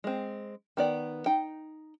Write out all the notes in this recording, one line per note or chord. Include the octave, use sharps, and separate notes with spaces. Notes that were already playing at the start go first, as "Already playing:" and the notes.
G#3 C4
D#3 B3 D5
D#4 G5